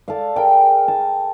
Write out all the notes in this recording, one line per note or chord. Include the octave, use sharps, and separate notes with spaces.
A4 D5 F5
G#4 A#4 G5
A5